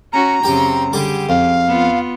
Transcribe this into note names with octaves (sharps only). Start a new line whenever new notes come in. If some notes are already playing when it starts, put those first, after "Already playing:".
C#4 F#4 A#5
F#2 C#3 C4 G4 G5
D3 G3 G4 G#4 D6
F2 F5
B3 F4